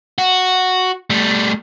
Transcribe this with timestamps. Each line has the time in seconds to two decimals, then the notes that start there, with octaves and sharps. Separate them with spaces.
0.18 F#4
1.10 G3 A3